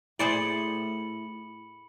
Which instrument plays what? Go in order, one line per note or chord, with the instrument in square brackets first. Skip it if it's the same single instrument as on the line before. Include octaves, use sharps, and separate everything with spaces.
[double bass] A2 [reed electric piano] E4 [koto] G#4 C5 D5 [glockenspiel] B5 C#7 F#7